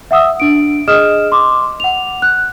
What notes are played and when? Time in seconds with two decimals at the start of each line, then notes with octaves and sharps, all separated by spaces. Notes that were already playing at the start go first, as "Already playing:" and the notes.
0.11 E5 F#5 D#6 E6
0.40 D4 D7
0.88 G#4 D#5 D#6 F6 E7
1.32 C6 D6
1.80 F#5 F7
2.22 F#6